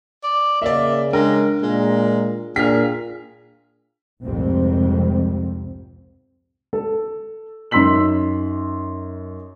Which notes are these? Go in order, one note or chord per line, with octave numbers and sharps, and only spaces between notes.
D5
C#3 A#3 D5 E5
G#3 D4 A#4
A#2 G#3
A#2 D4 G#4 F6 B6
F1 C2 F2 G#2 C3 C4
A4
F#2 D#4 C6 E6 B6 F#7